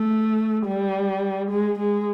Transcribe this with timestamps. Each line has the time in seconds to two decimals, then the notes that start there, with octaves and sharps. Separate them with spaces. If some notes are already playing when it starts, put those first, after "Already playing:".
Already playing: A3
0.66 G3
1.51 G#3
1.79 G#3